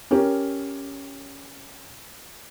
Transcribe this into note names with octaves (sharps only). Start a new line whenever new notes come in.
C#4 G4 A#4